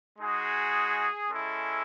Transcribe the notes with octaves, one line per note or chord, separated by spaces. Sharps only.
G#3 D#4 F#4 G#4
G#3 C#4 E4 A4